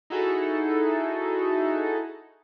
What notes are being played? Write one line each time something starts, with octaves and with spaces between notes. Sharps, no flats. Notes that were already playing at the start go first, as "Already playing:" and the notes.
D#4 E4 F#4 G#4 A4